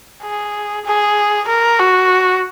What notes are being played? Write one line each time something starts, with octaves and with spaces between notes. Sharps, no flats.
G#4
G#4
A#4
F#4